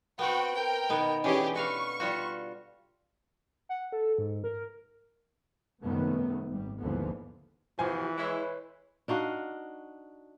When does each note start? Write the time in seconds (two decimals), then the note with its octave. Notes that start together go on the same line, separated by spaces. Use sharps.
0.19 B3 C4 F#4 G5
0.56 A#4 G5
0.89 B2 D#3 B3
1.24 D3 E3 C#4 G4 G#4
1.56 F#4 B4 F5 C#6
2.00 G3 F4 F#4
3.69 F#5
3.92 A4
4.18 G#2
4.44 A#4
5.81 F#2 C3 D#3 G3 A3 B3
6.47 G#1 G3
6.79 G#1 D#2 D3 E3 F3 B3
7.79 C3 E3 F3 F#4 G4 C5 G#5
8.17 G#3 E4 B4 C#5
9.08 D4 D#4 F#4 F5